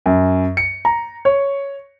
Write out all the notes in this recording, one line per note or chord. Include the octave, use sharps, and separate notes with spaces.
F#2
C#7
A#5
C#5